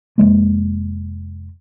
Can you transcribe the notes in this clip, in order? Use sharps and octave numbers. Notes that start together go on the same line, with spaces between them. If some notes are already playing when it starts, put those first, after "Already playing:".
F1 D#2 G#3 A#3